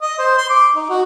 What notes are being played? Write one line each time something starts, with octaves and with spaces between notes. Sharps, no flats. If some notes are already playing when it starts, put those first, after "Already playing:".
D#5
C5
C6
D6
D#4
F#4